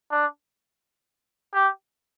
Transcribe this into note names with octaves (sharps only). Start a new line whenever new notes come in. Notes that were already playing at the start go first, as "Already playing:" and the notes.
D4
G4